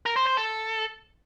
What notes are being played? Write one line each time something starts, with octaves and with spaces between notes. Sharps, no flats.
A#4
C5
C5
A4